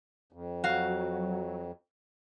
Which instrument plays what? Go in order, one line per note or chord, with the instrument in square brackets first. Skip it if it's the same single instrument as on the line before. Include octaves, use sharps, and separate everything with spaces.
[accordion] F2
[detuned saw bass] F#3 [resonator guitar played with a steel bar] F#4 F5